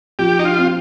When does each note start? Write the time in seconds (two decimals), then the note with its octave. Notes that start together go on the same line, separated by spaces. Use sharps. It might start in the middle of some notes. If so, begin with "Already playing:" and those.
0.19 F3 G4
0.39 D#4
0.45 F4
0.58 C4